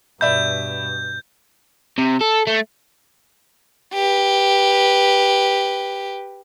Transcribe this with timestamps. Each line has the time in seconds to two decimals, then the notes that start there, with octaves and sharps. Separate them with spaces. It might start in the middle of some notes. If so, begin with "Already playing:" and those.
0.21 G2 B2 D5 E5 B5 G6
1.98 C3
2.21 A4
2.47 A3
3.94 G4 B4